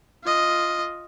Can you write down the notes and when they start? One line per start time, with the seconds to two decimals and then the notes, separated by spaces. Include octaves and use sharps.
0.23 F4 D#5